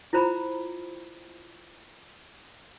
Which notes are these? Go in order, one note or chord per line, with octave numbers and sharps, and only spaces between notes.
E4 F4 C5 A#5 B5